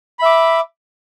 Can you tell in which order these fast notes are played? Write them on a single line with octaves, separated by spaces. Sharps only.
B5 E5 D6